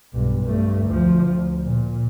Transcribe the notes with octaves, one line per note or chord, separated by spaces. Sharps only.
B1 G2
G2 A3
D2 F3
D2
A#2